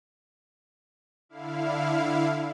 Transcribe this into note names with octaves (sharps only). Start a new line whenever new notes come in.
D3 E4 F5